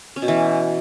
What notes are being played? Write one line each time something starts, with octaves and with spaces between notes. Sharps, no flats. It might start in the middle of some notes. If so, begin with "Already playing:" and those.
C#4
B2
E3